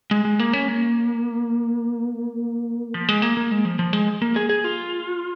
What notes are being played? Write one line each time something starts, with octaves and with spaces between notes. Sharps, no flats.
G#3
G#3
A#3
C#4
A#3
F3
G#3
A#3
A#3
G#3
F3
F3
G#3
A#3
G#4
G#4
F4